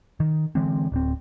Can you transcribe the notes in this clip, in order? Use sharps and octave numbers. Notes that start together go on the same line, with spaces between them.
D#3
D3 E3 G#3 C4
D1 C4